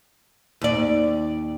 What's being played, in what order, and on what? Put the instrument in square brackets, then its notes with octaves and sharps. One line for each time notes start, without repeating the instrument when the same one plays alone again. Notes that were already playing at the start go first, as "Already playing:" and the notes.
[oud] D#2 D5